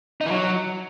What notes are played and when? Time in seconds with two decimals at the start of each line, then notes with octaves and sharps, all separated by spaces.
0.21 D#4
0.26 E3
0.31 F#3